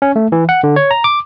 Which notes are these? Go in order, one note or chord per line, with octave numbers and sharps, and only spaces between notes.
C#4
A3
E3
F#5
D3
C#5
A#5
D6